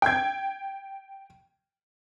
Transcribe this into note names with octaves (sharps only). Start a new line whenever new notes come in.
G5 G#6